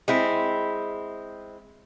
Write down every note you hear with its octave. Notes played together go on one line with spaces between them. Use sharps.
G#3 C4 E4